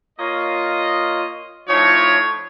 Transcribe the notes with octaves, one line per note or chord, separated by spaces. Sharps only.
A#3 F4 C#5 D#5
A2 F3 D#4 C#5